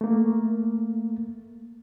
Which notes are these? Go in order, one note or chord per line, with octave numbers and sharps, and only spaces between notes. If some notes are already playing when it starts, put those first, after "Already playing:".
A3 A#3